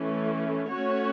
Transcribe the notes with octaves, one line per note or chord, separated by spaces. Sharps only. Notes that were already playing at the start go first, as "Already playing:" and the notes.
Already playing: E3 A3 C#4
A3 C#4 F#4 C#5